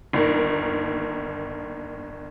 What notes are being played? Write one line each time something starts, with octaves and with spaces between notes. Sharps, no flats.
G1 D#2 A#4